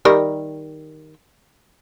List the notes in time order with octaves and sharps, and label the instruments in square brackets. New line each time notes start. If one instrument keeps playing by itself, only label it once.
[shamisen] D#3 G3 A#4